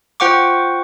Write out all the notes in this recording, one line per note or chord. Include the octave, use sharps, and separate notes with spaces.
F4 C5 F#5 G5 C#6 D6